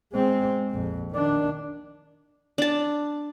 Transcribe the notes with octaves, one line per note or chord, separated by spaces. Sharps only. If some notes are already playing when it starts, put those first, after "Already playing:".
G#3 C4
A#1 F2
D#3 D4
D4 A5